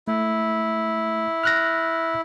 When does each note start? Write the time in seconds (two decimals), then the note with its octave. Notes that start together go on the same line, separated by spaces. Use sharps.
0.08 A3 E4
1.44 F6 F#6 A#6